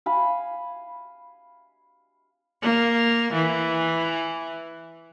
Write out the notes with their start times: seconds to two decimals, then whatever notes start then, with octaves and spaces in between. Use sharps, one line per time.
0.06 F5 G#5 B5
2.62 A#3
3.33 E3